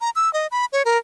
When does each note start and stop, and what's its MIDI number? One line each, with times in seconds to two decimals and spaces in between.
0.01 0.10 82
0.16 0.32 88
0.33 0.47 75
0.51 0.65 83
0.73 0.83 73
0.85 0.98 70